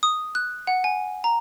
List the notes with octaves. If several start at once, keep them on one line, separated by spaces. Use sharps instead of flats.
D#6
F#6
F#5
G#5
A#5